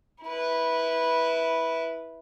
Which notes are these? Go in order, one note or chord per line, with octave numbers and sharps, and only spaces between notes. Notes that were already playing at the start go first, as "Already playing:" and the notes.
E4 B4